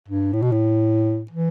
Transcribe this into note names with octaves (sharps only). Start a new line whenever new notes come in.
G2
A2
B2
A2
E3